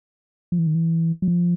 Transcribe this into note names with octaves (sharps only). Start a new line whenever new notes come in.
F3
E3
D#3
E3
F#3
F3